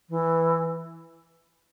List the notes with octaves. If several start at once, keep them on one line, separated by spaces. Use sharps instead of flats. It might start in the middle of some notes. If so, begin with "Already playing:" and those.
E3